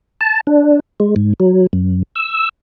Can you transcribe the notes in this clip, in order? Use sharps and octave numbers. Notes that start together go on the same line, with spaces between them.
A5
D4
G#3
G#2
F#3
F#2
E6